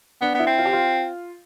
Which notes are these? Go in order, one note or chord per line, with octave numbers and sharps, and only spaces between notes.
B3 D4
B3
E4
C4
F4
G4
F4